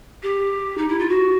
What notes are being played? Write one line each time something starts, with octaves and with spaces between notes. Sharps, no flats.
G4
D#4
E4
F4
F#4